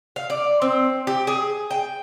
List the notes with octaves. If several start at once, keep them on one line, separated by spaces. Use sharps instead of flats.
F5
D5
C4
G4
G#4
G5